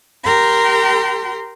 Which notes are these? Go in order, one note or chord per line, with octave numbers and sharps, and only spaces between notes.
G4 A#4 G5 A#5 C6